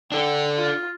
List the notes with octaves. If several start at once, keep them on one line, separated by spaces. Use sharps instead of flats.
D4 A4 G5
F4